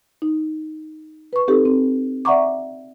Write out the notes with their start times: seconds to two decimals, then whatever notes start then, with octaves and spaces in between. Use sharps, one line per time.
0.22 D#4
1.33 B4 C#6
1.48 C4 D#4 G4 A4
1.65 C4
2.25 D5 E5 F#5 A#5 C#6 D6